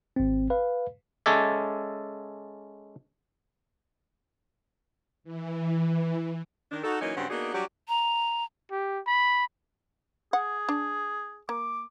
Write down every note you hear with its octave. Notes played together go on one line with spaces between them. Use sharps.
G#1 C4
B4 F5
G#3 C#4 A4 C#5 D5 E5
E3
D#3 D4
D#4 F#4 A4
E3 F#3 A#3 C#4 D#4
G2 C#3 F#3 C4 C5 F#5
A#3 B3 D4 D#4 F#4 G#4
F#3 G3 D4 F#4 G4
A#5
G4
B5
G#4 F#5
D4
A#3 D6